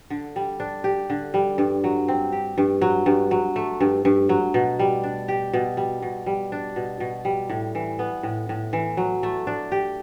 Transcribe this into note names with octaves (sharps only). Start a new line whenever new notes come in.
D3
G3
D4
G4
D3
G3
G2
F#3
C4
G4
G2
F#3
G2
F#3
A3
G2
G2
F#3
B2
G3
D4
G4
B2
G3
B2
G3
D4
B2
B2
G3
A2
E3
B3
A2
A2
E3
F#3
A3
D4
G4